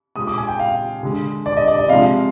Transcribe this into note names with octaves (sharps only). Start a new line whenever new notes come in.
A#2 G#3 D#6
D6
G#5
G5
F5
D3 G#3
D5
D#5
D5
D#5
C3 F3 G#3 F5